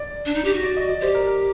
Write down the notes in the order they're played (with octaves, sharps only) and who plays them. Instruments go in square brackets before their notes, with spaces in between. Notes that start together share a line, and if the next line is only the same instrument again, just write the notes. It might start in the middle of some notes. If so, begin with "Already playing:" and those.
Already playing: [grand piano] D5
[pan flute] D4
D#4
G4
F#4
[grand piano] D5
D#5
D5
[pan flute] G4 [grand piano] C5
[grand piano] A#4
A#4